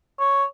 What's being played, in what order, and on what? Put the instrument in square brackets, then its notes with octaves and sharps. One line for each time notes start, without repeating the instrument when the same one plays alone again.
[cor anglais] C#5